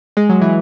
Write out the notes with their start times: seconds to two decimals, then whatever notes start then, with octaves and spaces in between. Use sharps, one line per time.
0.17 G#3
0.29 F#3
0.41 E3